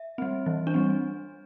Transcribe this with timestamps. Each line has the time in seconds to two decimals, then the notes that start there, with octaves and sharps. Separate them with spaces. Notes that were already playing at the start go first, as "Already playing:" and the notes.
Already playing: E5
0.18 G3 C4
0.46 E3
0.67 D4
0.74 G3 C4